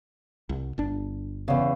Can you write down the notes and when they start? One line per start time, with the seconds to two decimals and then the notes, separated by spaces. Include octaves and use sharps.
0.49 C2
0.78 G1 D4
1.48 E2 C#3